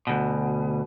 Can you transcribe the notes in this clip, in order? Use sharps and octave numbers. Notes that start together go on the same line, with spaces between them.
D2 B2